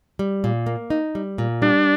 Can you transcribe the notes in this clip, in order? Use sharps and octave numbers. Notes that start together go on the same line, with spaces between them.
G3
A#2
A#3
D#4
G3
A#2
G3 D4